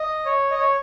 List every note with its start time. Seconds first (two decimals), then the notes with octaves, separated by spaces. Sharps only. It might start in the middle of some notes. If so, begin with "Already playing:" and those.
Already playing: D#5
0.25 C#5
0.51 D#5
0.59 C#5